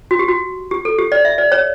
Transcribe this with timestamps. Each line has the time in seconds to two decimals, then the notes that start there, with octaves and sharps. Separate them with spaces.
0.11 F#4
0.19 G4
0.28 F#4
0.71 G4
0.85 A4
0.99 G4
1.12 D5
1.25 E5
1.38 D5
1.52 C#5